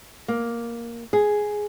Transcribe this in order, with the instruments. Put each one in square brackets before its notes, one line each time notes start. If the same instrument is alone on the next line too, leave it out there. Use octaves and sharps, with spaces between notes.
[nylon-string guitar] A#3
G#4